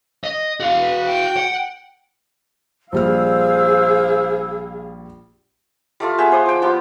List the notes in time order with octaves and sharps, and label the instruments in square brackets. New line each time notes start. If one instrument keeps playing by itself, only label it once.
[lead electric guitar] D#5
F#4 F5
[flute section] B4
G5
[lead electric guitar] F#5
[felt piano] A#1 G3 F6 [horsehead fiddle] G#4 F5 [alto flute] C5 [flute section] E6
[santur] G3 A3 F4
B3 G#4 E5 G5
C5 D5 F#5 D#6
F3 G5
F3 B3 F4 G4